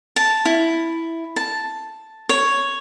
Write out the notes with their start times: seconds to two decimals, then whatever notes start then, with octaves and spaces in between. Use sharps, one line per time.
0.16 A5
0.45 E4
1.36 A5
2.29 C#5